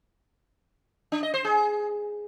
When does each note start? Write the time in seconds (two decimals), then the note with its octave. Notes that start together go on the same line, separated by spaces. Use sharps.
1.12 D4
1.23 D#5
1.34 C5
1.45 G#4